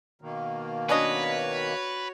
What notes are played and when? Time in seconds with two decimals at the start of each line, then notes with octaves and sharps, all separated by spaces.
0.22 B2 D#3 A#3
0.89 C#4 D4 F#4 B4 C#5 D#5